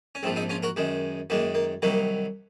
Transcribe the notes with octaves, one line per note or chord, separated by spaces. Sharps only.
C#4
A#1 G#2 F3 C4
C4 D#4
C#4 F4
F#4 A#4
F#2 D#3 G#3
F#2 D#3 G#3 A#3
A#3
C2 C3 D#3 F#3 A#3